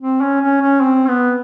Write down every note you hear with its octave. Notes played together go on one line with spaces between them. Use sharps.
C4
C#4
C#4
C#4
C4
B3